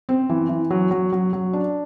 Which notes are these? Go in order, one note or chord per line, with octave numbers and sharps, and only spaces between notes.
C4
E3
E3
F#3
F#3
F#3
F#3
D4